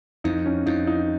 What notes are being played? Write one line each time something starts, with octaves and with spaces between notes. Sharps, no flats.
F2 D#4
C#4
F2 D#4
D#4